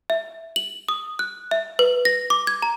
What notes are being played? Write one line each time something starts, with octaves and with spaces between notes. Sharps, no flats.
E5
F#7
D#6
F#6
E5
B4
A#6
D6
G#6
A#5